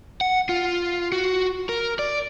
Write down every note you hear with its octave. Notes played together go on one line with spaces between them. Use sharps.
F#5
F4
F#4
A#4
D5